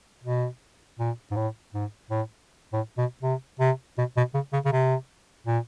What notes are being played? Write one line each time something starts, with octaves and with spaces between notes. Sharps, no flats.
B2
A#2
G#2
A2
G#2
A2
A2
B2
C3
C3
B2
B2
C#3
C#3
C#3
C3
A#2